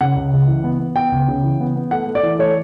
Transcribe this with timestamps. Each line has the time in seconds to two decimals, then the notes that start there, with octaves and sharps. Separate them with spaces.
0.01 C#3 F#5
0.16 C#2
0.33 C#2
0.48 E3
0.64 B3
0.80 B3
0.96 B3 G5
1.12 C#2
1.28 C#3
1.43 E3
1.61 B3
1.76 B3
1.91 A3 F#5
2.07 A3
2.15 D5
2.23 E3
2.39 A3 C#5